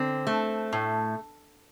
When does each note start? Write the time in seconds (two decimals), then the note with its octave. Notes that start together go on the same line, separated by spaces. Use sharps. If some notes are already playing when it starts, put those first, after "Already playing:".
Already playing: D3 C4
0.27 A3
0.73 A2